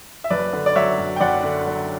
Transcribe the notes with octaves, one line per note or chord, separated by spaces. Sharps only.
E5
F#1 B4 D5
D3
D5
F#3 C#5 E5
F#2
G5
F#1 D5 F#5
D3
F#3